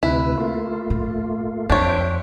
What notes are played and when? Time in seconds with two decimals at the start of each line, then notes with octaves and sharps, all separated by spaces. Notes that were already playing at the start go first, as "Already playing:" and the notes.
0.03 D2 C3 E4 B4
0.38 A3 A#3 F4
0.90 A2
1.70 F2 D4 C5 C#5 E5 G5